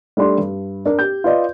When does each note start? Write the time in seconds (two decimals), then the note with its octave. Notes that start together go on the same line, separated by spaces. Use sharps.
0.17 G3 A3 D4 C6
0.38 G2
0.86 D4 A#4
0.99 G4 G6
1.24 F4 B4 D5 D#5